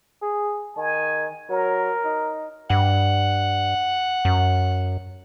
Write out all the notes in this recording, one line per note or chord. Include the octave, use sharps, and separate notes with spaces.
G#4
D#3 G#5
F#3 A#4
D#4
G2 F#5
F#2